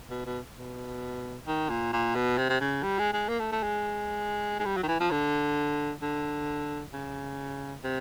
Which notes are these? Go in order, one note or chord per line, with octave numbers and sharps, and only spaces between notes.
B2
B2
B2
D#3
A#2
A#2
B2
C3
C3
C#3
G3
G#3
G#3
A#3
A3
A3
G#3
G#3
G3
F#3
D#3
E3
F3
D3
D3
C#3
C3